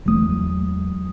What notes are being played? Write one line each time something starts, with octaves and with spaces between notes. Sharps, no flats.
E2 E3 F#3 G#3 D#6